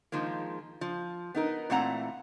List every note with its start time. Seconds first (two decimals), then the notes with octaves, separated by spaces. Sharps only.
0.12 D#3 F3 G#3 A#3
0.81 F3
1.35 B3 D#4 A#4
1.70 A#2 E3 A3 C4 F#5 A#5